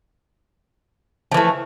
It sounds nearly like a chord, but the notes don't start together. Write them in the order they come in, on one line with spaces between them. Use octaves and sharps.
F3 E3 A3